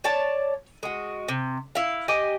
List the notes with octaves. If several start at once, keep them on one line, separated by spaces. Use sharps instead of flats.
C#5 D5 A5
G#3 F#4
C3
E4 F5
G4 D#5 G#5